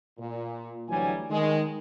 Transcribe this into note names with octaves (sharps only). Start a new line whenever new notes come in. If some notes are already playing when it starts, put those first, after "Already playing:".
A#2
D2 E3 F#3 G3 G#5
D#3 G#3